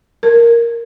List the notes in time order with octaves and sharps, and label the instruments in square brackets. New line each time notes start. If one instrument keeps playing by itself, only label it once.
[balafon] A#4